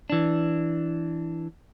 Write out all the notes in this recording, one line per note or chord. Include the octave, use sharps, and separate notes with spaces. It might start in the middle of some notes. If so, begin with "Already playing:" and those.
E3 D4